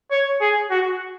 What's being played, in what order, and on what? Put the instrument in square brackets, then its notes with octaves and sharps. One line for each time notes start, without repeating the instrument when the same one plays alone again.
[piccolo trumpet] C#5
G#4
F#4